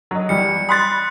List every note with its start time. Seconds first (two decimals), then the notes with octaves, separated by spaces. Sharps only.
0.11 F#3 D#5
0.29 E2 G3 C#7
0.69 B5 C6 D#6 F#6 A6